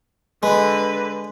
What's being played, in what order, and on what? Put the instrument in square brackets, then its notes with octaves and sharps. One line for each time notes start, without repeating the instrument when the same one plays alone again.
[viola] D3 B4 [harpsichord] G#3